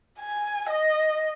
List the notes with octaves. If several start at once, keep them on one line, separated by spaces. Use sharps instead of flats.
G#5
D#5